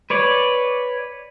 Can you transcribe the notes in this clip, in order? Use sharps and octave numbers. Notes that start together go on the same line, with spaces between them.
B4 C#5 D5